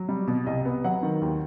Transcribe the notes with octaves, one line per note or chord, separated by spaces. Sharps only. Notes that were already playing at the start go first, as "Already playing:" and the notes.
Already playing: F#3
G3
B2
C2 D#5
B3
F#3 F#5
D#3
D#2